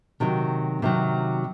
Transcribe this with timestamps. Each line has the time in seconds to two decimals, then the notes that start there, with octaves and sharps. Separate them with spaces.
0.20 C3 D#3 F#3
0.82 C3 D#3 F#3